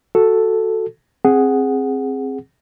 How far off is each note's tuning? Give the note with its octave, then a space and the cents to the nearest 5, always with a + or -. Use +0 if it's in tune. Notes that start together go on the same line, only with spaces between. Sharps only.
F#4 +0 A4 +0
C4 +15 G#4 +0 F#5 +0